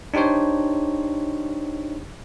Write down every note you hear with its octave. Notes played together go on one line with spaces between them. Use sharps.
D4 D#4 G4 C5 C#5